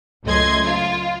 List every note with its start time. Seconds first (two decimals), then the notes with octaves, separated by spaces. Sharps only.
0.24 C#2 F#2 A3 D#5 C6 G#6
0.64 F4